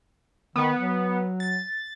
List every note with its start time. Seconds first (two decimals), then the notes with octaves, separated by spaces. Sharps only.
0.56 D#3 B3
0.75 F#3
1.40 A6